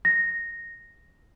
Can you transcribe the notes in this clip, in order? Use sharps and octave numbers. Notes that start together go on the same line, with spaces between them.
A#6